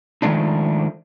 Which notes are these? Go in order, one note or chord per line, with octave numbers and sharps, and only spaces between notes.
D#3 F3 G#3 A3 D4 D#4